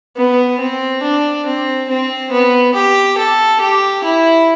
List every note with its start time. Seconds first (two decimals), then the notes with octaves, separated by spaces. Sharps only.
0.17 B3
0.60 C4
1.03 D4
1.46 C4
1.89 C4
2.32 B3
2.75 G4
3.18 A4
3.61 G4
4.04 E4